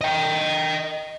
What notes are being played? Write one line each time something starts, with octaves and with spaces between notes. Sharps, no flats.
D#5 G5